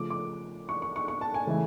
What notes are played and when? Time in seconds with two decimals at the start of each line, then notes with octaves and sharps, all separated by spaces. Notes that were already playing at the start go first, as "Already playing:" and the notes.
Already playing: C#3 F3 A3 D6
0.10 D6
0.69 C#6
0.82 C#6
0.96 C#6
1.08 C#6
1.21 A5
1.34 G#5
1.47 C#3 E3 A3